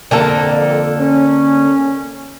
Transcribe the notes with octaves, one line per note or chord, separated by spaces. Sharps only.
F2 D3 A#3 A4
C#4